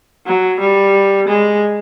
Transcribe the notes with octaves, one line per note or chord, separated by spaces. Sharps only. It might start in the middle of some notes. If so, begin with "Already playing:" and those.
F#3
G3
G#3